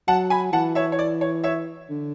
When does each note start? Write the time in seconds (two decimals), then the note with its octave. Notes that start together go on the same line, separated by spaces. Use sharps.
0.08 F#3 F#5 A5
0.30 G#5 B5
0.53 E3 F#5 A5
0.75 C#5 E5
0.92 C#5
0.99 D5
1.21 C#5
1.44 C#5 E5
1.89 D3